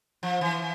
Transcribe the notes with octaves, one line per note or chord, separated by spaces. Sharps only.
F3
E3